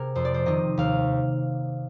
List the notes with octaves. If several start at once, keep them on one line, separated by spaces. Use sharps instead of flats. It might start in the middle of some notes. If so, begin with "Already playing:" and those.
Already playing: C3 G#4 A#4
F2 C5
D5
C5
C3 D#3 D#5
D#2 F5